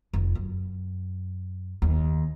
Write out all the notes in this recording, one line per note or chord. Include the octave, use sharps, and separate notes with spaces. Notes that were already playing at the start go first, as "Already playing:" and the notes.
F1
F#2
D#2